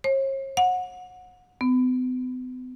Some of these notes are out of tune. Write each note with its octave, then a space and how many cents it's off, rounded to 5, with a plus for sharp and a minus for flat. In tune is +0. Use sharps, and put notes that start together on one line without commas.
C#5 -45
F#5 -20
B3 +45